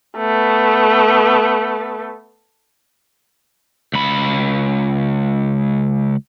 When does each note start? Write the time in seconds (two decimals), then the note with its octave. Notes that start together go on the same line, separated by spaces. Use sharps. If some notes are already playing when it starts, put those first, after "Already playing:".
0.17 A3 B3
3.94 C#2 B5